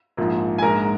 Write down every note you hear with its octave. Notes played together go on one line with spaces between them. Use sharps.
A#1 G#2 F3 A#3
G#5
A#1 G#2 G#3 A#4 A#5